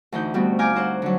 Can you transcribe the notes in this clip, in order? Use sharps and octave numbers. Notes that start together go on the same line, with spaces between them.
D2 E3 D#4 G6
G3 A3 B3 C4 F#4
F5 G#5 A#5 D6 F6 G6
F#4 C5 F#5
D3 F#3